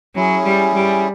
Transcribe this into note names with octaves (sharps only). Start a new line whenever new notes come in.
F#3 C#4 E4 G#4
G3
G3